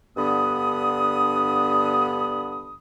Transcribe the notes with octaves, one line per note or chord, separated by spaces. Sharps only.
G2 D3 B3 B5 D#6